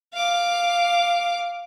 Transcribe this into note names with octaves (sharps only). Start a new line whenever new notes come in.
F5 D6